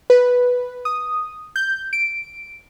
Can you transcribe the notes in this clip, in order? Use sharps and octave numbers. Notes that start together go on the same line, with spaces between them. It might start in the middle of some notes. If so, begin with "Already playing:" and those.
B4
D#6
G6
D7